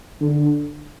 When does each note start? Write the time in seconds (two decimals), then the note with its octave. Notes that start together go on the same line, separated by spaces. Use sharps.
0.21 D3